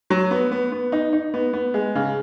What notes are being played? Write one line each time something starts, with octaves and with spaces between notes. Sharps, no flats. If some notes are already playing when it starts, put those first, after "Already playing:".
F#3
B3
B3
B3
D#4
D#4
B3
B3
G#3
C#3